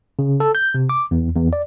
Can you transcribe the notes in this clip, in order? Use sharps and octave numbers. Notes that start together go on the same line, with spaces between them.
C#3
A4
G6
C3
D6
E2
E2
D5